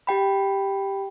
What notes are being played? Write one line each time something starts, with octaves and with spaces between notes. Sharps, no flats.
G4 G5 B5